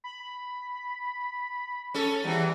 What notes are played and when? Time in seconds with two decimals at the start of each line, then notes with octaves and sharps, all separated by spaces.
0.04 B5
1.94 C#4 A4
2.24 E2 E3 G3